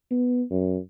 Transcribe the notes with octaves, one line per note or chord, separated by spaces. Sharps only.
B3
F#2